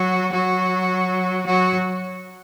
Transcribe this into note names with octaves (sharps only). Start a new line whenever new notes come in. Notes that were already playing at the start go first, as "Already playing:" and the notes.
Already playing: F#3 F#4
F#3 F#4
F#3 F#4